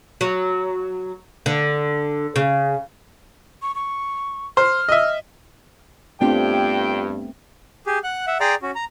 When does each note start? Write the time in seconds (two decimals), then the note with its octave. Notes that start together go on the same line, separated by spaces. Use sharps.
0.21 F#3
1.46 D3
2.36 C#3
3.62 C#6
3.75 C#6
4.57 C5 F6
4.89 D#5 E5
6.21 G2 A3 B3 C4 D4 F4 G4 G5
7.86 G4 G#4
8.04 F#5 F#6
8.27 E5 F#5
8.40 G#4 D5 G5 A#5 C6 D6
8.62 C#4 F#4
8.75 A#5